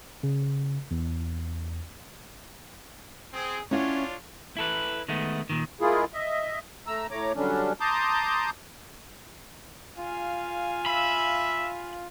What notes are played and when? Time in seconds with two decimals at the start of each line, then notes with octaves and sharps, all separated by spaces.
0.23 C#3
0.91 E2
3.33 C4 G#4
3.71 C#4 D4 E4 F4 C#5 F#5
4.57 E4 A4 B4
5.08 D#3 G#3 A3 B3
5.50 A#2 D#3
5.81 G#3 A#3 E4 F4 G#4
6.14 D#5 E5
6.87 A3 A#5 E6
7.11 A2 A3 C#5 A#5 D6
7.35 D3 F#3 G3 C#4 D4
7.80 A5 A#5 C6 D6 D#6 G6
9.97 F4 F5 G#5
10.86 E5 B5